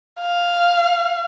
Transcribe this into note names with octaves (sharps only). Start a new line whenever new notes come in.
F5